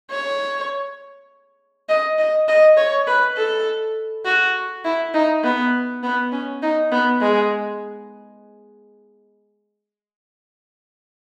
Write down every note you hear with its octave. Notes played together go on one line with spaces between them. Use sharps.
C#5
D#5
D#5
D#5
C#5
B4
A4
F#4
E4
D#4
B3
B3
C#4
D#4
B3
G#3